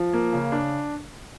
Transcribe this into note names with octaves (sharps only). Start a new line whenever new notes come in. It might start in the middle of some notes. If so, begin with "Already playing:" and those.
Already playing: F3
A#3
C#3
D4